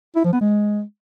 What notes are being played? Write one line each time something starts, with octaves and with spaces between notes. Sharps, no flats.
E4
F3
B3
G#3